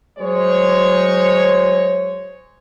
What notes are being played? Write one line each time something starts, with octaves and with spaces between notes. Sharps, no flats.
F#3 G#3 C5 C#5